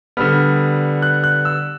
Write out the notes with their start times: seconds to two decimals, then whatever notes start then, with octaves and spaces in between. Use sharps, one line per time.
0.17 D3 G3 B3 F6
1.02 F#6
1.24 F#6
1.45 E6